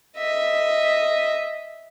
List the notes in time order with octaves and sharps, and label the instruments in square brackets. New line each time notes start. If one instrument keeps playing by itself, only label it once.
[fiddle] D#5 E5